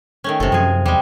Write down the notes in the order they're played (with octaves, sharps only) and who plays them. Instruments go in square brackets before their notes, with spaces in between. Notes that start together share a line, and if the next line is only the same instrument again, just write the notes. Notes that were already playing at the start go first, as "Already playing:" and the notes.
[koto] D#3 A3 C#4
[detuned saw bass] F#1 [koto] C3 A4
[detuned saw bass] F#2 [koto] F3 G#4
[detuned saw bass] E2 [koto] G3 G#3